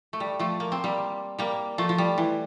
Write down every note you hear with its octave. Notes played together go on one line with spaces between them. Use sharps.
A3
G3
F3 A3
A#3
C4
G3 A#3
G3 A#3
F3 A3
F3
G3
E3